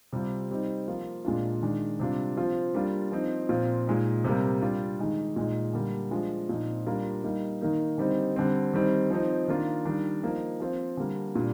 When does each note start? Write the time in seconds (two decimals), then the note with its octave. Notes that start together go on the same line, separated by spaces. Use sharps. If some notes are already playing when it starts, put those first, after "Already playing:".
0.13 C3 G3 C4 F4
0.51 G3 C4 D#4
0.88 F3 A#3 F4
1.25 A#2 G#3 D4 F4
1.62 D#3 G#3 D4
2.00 C3 G3 D4 F4
2.37 F3 C4 F4
2.74 G3 A#3 D4 F4
3.12 F3 C4 D#4
3.49 A#2 F3 C4 F4
3.87 A#2 G#3 D#4
4.24 C3 G3 A#3
4.62 G3 D4 F4
4.99 D#3 G#3 D#4
5.36 A#2 G#3 D#4
5.73 D3 G3 A#3
6.11 F3 G#3 D4 F4
6.49 A#2 F3 C4 D#4
6.87 G3 A#3 D4 F4
7.23 G3 A#3 D#4
7.61 D#3 A#3 D#4
7.98 D3 G3 C4 D#4
8.36 D3 G3 C4
8.73 D#3 G3 C4 D#4
9.11 F3 C4 D#4
9.48 D#3 A#3 D4 F4
9.85 D#3 G3 D4
10.23 F3 A#3 D#4
10.60 F3 C4 F4
10.97 D3 G3 A#3
11.35 A#2 G3 D4